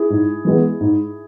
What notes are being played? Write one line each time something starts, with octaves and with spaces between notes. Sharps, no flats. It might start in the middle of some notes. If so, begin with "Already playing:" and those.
Already playing: E4 G#4
G#2
E3 G#3 B3
G#2